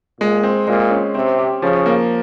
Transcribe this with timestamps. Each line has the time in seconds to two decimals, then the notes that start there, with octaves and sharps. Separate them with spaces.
0.20 A#2 G#3
0.43 C4
0.67 A#2 G#3
0.91 C#4
1.15 C3 C4
1.38 G4
1.62 C#3 F3
1.86 A#3